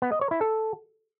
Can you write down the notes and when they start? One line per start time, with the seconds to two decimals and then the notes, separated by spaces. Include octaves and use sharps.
0.02 B3
0.12 D#5
0.21 C#5
0.31 E4
0.41 A4